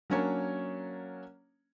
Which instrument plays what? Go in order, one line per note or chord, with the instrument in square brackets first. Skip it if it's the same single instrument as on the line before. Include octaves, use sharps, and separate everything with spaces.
[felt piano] F#3 A#3 C#4 D4 C#5